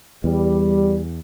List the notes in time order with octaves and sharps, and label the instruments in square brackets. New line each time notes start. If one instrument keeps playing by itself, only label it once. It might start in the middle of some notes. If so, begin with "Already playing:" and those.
[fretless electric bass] E2 [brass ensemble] G3